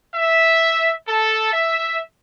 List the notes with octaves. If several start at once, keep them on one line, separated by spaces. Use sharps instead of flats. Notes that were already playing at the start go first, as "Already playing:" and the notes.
E5
A4
E5